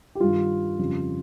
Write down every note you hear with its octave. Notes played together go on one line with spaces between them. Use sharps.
G4
G2 D#3 G3 F4
F2 C#3 G3